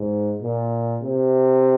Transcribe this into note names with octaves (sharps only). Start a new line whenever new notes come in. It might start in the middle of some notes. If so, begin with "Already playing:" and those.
Already playing: G#2
A#2
C3